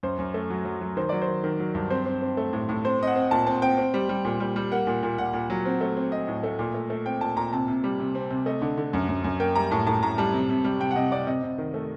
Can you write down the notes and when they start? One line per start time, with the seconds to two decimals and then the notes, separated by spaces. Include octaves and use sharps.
0.03 F#2 C5
0.19 F#2
0.34 A3
0.50 F#3
0.65 F#3
0.82 F#3
0.97 D#3 C5
1.09 F#3 D5
1.22 C5
1.28 D#3
1.44 D#3
1.60 F#3
1.75 G2
1.90 C4 C5
2.06 C4
2.22 C4
2.37 A3
2.53 A2
2.69 A2
2.84 C4 C5
2.99 C4 D#5
3.07 F#5
3.15 C4
3.31 A#2 A5
3.46 C4 A5
3.62 C4 G5
3.78 C4
3.94 G3
4.09 G3
4.25 A#2
4.40 G3
4.56 G3
4.72 A#3 F#5
4.87 A#2
5.03 A#2
5.18 A#2 F#5
5.33 A#2
5.50 F#3
5.65 C4
5.81 A3
5.96 C4
6.12 C4 D#5
6.28 A2
6.43 A3
6.59 A#2
6.74 A3
6.90 A3
7.06 C4 G5
7.21 A#2 A5
7.36 A#2 A#5
7.53 C3 A5
7.68 C3
7.84 G3
8.00 C3
8.15 C4
8.30 C3
8.46 A3 D#5
8.62 D3
8.77 D3
8.93 F#2
9.09 F#2
9.24 F#2
9.40 A#3 G5
9.55 G3 A#5
9.71 A2 A5
9.87 A2 A5
10.02 A2 A#5
10.18 G3 A5
10.33 C3
10.49 C3
10.64 G3
10.80 C3 G5
10.91 F#5
10.96 C3 D#5
11.12 C3 D5
11.27 C3 D#5
11.43 C3
11.58 D#3
11.74 A3